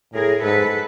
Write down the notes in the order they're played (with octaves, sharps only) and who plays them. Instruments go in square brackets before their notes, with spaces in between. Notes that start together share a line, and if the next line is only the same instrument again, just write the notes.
[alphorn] A2 [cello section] G#4 A#4
[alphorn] G#2 [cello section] A4 B4